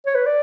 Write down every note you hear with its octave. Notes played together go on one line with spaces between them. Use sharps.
C#5
B4
D5